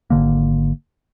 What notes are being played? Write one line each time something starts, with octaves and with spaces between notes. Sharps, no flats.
G#1 E2 D3 A#3